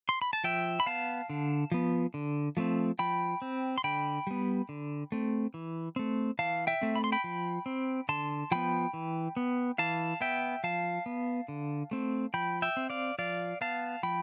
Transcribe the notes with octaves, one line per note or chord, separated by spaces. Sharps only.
C6
B5
A5
F3 E5 G5
B5
B3 F5 A5
D3
F3 B3
D3
F3 A3 C4
F3 G5 B5
C4
C6
D3 G5 B5
G3 B3
D3
A3 C4
E3
A3 C4
E3 F5 A5
E5 G5
A3 C4
B5
C6
G5 B5
F3
C4
D3 A5 C6
F3 B3 G5 B5
E3
B3
E3 F5 A5
B3 E5 G5
F3 F5 A5
B3
D3
A3 C4
F3 G5 B5
E5 G5
C4
D5 F5
F3 D5 F5
B3 F5 A5
F3 G5 B5